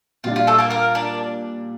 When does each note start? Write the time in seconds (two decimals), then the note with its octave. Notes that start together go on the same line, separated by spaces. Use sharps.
0.24 A#2 G3 D4 F4
0.36 F4
0.47 A3 A4
0.59 A#3 A#4
0.70 A#3 A#4
0.95 D4 D5